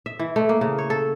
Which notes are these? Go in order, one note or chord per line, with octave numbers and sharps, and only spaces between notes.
E5
E3
A3
A#3
C#3
C#5
A4